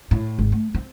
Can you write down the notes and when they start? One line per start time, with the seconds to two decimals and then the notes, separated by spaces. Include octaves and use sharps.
0.11 A2
0.39 G#1
0.52 A3
0.74 C4